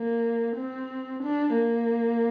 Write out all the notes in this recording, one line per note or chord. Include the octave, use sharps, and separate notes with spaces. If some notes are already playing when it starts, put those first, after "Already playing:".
Already playing: A#3
C4
D4
A#3